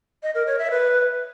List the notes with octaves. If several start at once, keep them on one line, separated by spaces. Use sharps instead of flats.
D#5
A#4
C#5
E5
B4